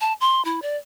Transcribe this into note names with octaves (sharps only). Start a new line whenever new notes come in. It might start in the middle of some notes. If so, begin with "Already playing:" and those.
A5
C6
E4
D5